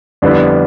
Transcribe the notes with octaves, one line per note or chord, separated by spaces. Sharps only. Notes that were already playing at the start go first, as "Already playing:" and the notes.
F2 D3 G3 B3 E4